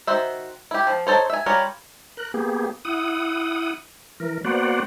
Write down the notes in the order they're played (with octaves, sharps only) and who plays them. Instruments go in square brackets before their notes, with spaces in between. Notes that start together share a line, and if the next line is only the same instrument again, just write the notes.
[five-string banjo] D#3 F#4 C5 E5
E4 G4
F3
D#4 A4 C5 C#5
E5 G#5
G3 C#4 F4 A#4 C#5
[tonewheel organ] A#4 F#6
A#3 B3 G4 G#4
E4 F#5 D#6
E3 A#4
A#3 B3 F#4 C5 D5 F#5